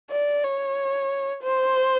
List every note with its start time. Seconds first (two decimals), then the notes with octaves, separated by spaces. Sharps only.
0.11 D5
0.44 C#5
1.43 C5